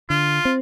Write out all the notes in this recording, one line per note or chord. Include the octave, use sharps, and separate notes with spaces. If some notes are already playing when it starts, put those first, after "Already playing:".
D3 F4
C4